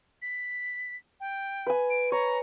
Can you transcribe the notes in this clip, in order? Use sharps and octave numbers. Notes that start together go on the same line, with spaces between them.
B6
G5
B4 G#5
D7
C#5 A#5